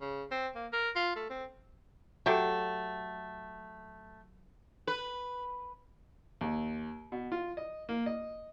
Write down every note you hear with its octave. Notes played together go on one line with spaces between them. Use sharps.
C#3
C4
A#3
A#4
F4
A3
C4
F#3 A3 G4 A4 G5
B4
D#2
B2
F4
D#5
A#3
D#5